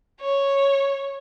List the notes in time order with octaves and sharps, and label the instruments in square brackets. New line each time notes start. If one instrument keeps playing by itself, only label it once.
[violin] C#5